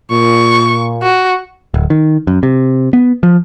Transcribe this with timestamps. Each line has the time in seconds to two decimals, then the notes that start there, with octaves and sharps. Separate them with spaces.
0.11 A#2 C#6
1.02 F#4
1.74 D1
1.90 D#3
2.27 F#2
2.43 C3
2.93 B3
3.23 F3